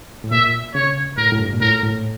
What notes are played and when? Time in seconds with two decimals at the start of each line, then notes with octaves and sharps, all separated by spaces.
0.24 A2
0.31 A#2 E5
0.74 C#3 C#5
1.18 A2 A#4
1.32 A2
1.40 G2
1.53 A#2
1.61 A2 A#4
1.83 A2